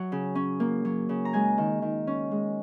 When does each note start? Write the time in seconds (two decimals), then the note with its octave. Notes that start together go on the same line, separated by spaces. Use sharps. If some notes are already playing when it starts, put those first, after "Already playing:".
Already playing: F#3 F#5
0.12 C#3
0.35 C#4
0.60 A#3
0.85 F#3
1.09 C#3
1.25 A#5
1.33 G#3 G#5
1.58 D#3
1.82 D#3
2.07 C#4
2.31 G#3